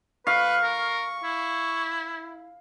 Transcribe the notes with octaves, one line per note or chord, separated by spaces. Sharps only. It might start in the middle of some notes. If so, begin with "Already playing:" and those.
B4 F5 C#6
A#4
E4